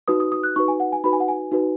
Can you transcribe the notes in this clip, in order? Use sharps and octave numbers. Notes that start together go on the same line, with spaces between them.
D#4 F#4 B4 D#6
D#6
D#6
F#6
D#4 F#4 B4 C#6
G#5
F#5
G#5
D#4 F#4 B4 B5
G#5
F#5
G#5
D#4 F#4 B4